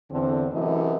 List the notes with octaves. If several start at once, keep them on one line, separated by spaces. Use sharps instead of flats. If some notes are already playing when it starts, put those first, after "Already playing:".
E2 D3 C4
F#2 C3 E3 A3 E4 D#5